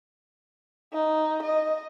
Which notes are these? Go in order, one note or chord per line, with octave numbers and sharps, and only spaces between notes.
D#4
D#5